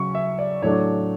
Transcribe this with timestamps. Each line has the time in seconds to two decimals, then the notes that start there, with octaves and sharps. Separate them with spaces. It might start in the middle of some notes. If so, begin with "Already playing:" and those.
Already playing: C#3 F#3 C#4 C#6
0.15 E5
0.39 D5
0.62 A2 F#3 A3 D4 C#5